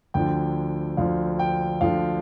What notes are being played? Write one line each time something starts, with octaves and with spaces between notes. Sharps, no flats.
D2 D3 F3 G5
D2 D3 F3 F5
G5
D2 D3 F3 F5